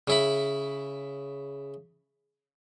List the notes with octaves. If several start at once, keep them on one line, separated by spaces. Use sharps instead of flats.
C#3 E4 B5